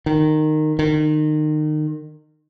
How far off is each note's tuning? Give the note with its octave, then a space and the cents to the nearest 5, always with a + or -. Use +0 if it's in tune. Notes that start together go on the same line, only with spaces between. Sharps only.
D#3 -15
D#3 -30